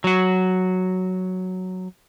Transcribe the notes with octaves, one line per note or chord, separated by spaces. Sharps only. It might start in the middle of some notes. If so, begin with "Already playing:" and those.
F#3 F#4